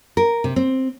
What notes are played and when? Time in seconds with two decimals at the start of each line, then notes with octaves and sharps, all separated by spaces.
0.17 A#4
0.44 C3
0.56 C4